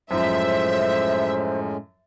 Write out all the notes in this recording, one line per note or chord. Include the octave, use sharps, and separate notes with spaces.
F#2 A2 F3 G#3 C#4 C5 E5